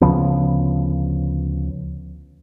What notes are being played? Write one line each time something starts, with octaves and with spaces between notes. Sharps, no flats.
D2 C#3 F3 B3